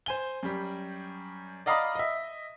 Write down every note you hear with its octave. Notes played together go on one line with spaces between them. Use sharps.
C5 G#5 G7
F#2 G3
D5 D#5 F5 A#5 B5 D#6
D#5 E5